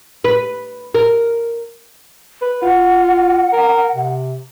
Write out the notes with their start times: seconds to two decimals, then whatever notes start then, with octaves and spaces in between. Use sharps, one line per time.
0.24 B4
0.95 A#4
2.41 B4
2.62 F4 F#5
3.53 A#4
3.95 C3